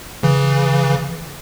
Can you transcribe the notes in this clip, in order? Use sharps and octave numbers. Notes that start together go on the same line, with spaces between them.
C#3 E3